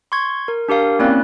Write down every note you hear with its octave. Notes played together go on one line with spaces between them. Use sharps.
C6 C#6 G#6
A#4
D4 G4 A#4 F5
A#3 C4 C#4 E4 D5 F#6